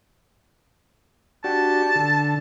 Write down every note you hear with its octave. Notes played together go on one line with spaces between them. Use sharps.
D4 F#4 G4 A5
D3